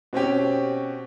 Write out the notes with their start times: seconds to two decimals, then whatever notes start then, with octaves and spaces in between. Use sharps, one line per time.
0.13 B2 C4 C#4 G4